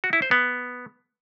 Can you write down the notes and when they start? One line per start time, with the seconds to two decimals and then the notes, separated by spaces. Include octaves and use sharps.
0.04 F#4
0.13 E4
0.22 C5
0.31 B3